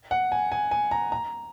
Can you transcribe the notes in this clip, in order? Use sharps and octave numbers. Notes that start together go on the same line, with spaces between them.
F#5
G#5
G#5
G#5
A#5
A#5